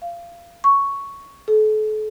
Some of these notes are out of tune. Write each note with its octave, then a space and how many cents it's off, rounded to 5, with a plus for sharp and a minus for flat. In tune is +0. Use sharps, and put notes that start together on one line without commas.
F5 -25
C#6 +5
A4 -40